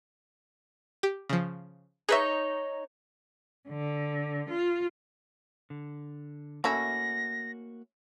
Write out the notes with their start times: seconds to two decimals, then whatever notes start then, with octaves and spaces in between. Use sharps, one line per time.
1.03 G4
1.30 C#3 F3
2.09 D#4 G#4 B4 C#5 E5
3.70 D3
4.51 F4
5.70 D3
6.64 A3 A#3 C#4 E4 F#4 A#6